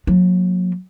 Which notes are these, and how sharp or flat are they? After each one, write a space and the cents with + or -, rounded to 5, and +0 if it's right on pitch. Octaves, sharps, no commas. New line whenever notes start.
F#3 -30 A#3 +0